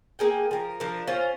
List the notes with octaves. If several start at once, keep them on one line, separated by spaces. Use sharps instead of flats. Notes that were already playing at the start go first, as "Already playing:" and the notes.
A#3 G#4 G5
F3 A#4
F3 D4 A#4
C#4 F4 C5 F5